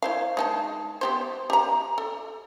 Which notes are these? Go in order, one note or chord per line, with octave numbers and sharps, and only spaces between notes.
E4 C5 F5
G#3 D#4 A5
B3 G4 C5
G4 A#5
A4